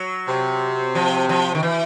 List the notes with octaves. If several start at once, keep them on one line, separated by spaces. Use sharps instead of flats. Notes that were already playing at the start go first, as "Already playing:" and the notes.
Already playing: F#3
C3
F3
F3
D#3
E3